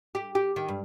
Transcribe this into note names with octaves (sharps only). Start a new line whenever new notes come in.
G4
G4
D#3
G2